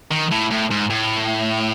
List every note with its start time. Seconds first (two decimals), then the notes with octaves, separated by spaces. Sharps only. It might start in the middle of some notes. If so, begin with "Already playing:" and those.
0.11 D#3
0.31 A2
0.51 A2
0.71 G#2
0.90 A2